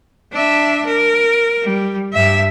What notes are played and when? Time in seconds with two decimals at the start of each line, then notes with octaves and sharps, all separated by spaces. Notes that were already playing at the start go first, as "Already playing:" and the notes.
0.33 D4 E5
0.87 A#4
1.63 G3
2.13 G2 E5